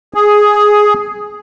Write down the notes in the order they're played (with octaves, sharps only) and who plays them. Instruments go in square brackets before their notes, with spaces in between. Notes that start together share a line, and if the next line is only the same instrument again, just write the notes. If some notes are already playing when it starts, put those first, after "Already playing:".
[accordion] G#4